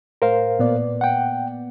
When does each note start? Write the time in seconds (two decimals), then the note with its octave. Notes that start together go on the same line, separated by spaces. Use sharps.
0.22 A2 A#4 C5 F5
0.59 A#2 B3 D5
1.01 F#5 G5